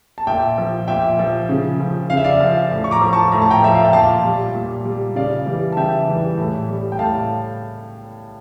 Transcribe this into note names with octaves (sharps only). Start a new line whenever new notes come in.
A5
A#2 E5 G5
F3
A#2 E5 G5
F3
C#3
F3
C#3 F5
E5
D5 F5
F3
A2
C#6
A#5 D6
F3
A5 C#6
A2 A#5
A5
G5 A#5
F3 E5
F5
G5
A#2 F5 A5
G3
A#2
G3
C#3 D5 F5
E3 G3
A5
C#3 E5 G5
E3 G3
A2
G3
G5
A2 F5 A5